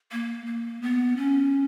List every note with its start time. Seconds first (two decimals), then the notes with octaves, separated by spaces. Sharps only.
0.12 A#3
0.46 A#3
0.82 B3
1.17 C#4